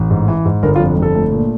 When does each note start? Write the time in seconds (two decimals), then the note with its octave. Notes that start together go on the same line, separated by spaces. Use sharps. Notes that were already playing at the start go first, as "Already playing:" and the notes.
Already playing: A1
0.11 G#2
0.28 E3
0.45 G#2
0.63 G1 A#4
0.76 F4
0.80 F2
0.97 G1
1.02 A4
1.15 A3
1.32 A#2